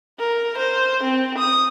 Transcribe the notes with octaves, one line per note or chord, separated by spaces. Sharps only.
A#4
C5
C4
D#6